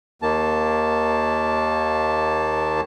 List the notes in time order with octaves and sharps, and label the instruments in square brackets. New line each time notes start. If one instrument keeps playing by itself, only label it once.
[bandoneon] D#2 D#3 A#3 A5